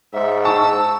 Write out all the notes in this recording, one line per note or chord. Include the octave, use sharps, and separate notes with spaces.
G#2 E5
A5 C#6 E6